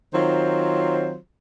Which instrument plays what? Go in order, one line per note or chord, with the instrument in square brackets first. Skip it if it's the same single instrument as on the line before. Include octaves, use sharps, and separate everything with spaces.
[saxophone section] D#3 F#3 C4 F4 C5